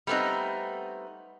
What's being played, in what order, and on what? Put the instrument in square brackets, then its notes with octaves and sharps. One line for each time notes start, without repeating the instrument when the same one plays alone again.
[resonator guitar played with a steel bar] G3 A3 B3 C4 D#4